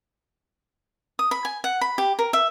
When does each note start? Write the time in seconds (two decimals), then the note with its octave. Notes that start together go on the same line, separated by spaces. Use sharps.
1.19 D#6
1.31 B5
1.45 G#5
1.64 F#5
1.81 B5
1.98 G4
2.19 A#4
2.33 E5